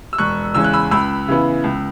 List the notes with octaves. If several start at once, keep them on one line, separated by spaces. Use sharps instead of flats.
E6
E1 C#6 F#6
E2 C#3 G#3 C#4 E6
F#6
B5 E6
C#2 B5 E6
C#3 E3 B3
C#2